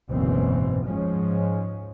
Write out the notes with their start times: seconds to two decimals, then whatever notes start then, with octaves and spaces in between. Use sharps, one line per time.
0.10 F#1 D2 G#2 B2 E3 C4
0.85 G#2 F3 G#3 C#4